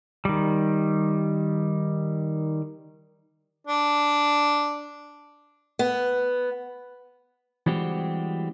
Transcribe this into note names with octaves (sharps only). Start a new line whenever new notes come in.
D#3 G3
D4
B3
E3 G3 G#3 C4 F#4 G4